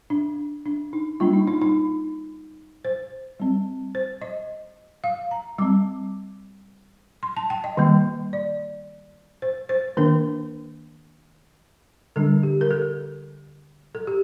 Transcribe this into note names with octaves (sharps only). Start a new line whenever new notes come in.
D4
D4
D#4
G3 A#3 D4 F4
D#4
D#4
D#4
C5
G3 C4
C5
D#5
F5
A#5
G3 C4 D6
C6
A5
G5
D#5
D#3 G3 A#3
D5
C5
C5
D#3 A#3 D4 A#4
D3 G3 D4 A4
G4
A#4
A4
A4
G4